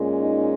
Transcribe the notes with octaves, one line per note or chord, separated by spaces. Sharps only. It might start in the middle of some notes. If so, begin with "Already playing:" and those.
Already playing: A#2 G#3 C#4
D#4